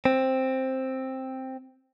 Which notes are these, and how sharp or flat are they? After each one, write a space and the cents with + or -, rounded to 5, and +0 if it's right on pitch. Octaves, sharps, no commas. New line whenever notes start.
C4 +5